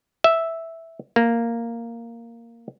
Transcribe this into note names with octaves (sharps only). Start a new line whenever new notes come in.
E5
A#3